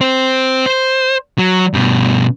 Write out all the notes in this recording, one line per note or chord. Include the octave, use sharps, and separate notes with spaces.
C4 C5
C5
F#3
G2 B2